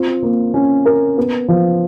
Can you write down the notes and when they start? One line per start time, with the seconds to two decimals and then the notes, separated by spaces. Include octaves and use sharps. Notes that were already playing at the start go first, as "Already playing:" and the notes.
Already playing: C4 F4
0.23 A#3
0.54 C#4
0.86 A#4
1.17 B3
1.48 F3